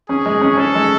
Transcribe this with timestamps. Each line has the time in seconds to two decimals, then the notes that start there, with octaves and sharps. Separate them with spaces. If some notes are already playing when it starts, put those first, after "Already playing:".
0.09 C#4 G#4
0.26 G#3
0.42 C#4
0.57 C#4 A4
0.75 G#3